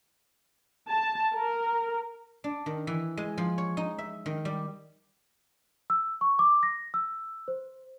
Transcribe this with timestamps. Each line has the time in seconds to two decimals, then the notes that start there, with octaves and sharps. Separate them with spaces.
0.89 A5
1.35 A#4
2.44 D4
2.66 D#3
2.87 E3
3.17 G#3
3.38 F3
3.58 C#5
3.77 D#4
3.98 E5
4.26 D#3
4.45 G3
5.90 E6
6.21 C#6
6.39 D6
6.63 A#6
6.94 E6
7.48 C5